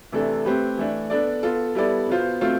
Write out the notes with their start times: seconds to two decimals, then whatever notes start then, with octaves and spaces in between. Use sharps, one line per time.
0.12 C3 E3 A3 D4 A4
0.45 A3 C4 G4 B4
0.77 E3 A3 D4
1.10 B3 D4 A4 D5
1.43 B3 F4 A4
1.75 G3 B3 E4 A4 D5
2.09 B2 B3 F4 C5
2.41 B2 A3 C4 F4 C5